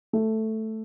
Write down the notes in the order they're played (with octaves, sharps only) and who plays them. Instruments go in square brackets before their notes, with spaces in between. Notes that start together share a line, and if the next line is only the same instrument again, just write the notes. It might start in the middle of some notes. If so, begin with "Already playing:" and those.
[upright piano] A3